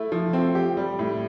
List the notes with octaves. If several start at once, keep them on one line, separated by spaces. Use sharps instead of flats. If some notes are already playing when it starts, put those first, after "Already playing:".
Already playing: A3 E4
F3
C4
G4
G3
A2